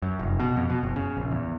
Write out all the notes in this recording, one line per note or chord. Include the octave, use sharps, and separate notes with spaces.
F#2
F1
B2
F2
B2
F#1
C#3
A#1
E2